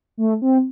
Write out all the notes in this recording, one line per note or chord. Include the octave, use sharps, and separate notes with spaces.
A3
C4